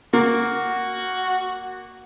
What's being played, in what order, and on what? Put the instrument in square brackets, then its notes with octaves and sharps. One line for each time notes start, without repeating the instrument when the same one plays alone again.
[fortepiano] A#3 [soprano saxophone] F#4